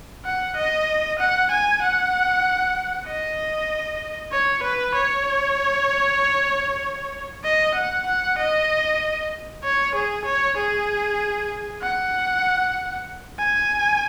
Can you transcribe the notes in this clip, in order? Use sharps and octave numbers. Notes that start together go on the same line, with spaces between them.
F#5
D#5
F#5
G#5
F#5
D#5
C#5
B4
C#5
D#5
F#5
F#5
D#5
C#5
G#4
C#5
G#4
F#5
G#5